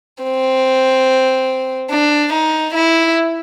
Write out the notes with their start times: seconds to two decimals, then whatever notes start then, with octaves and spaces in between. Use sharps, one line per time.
0.24 C4
1.90 D4
2.33 D#4
2.74 E4